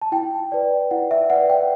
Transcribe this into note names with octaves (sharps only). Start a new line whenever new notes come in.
A5
E4 G5
B4 D5
E4 F#5
E5
B4 D5 F#5
G5